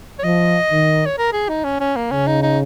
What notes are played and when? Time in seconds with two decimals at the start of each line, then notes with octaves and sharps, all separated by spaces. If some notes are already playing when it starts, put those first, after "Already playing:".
0.19 C#5
0.24 F3 D#5
0.71 D#3
1.06 C#5
1.18 A#4
1.33 G#4
1.49 D#4
1.64 C#4
1.80 C#4
1.96 A#3
2.11 C#3 C#4
2.27 D#4
2.43 D#4